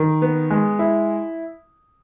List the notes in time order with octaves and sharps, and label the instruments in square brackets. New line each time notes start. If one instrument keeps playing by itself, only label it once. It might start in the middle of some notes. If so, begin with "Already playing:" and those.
Already playing: [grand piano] D#3
B3
G#3
E4